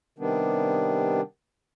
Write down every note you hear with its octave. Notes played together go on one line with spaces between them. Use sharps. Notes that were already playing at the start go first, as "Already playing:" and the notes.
C3 D#3 G3 B3 D4